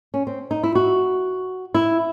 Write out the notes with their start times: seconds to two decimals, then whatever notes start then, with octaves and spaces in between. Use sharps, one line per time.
0.14 C#4
0.27 C4
0.51 D#4
0.63 E4
0.75 F#4
1.74 E4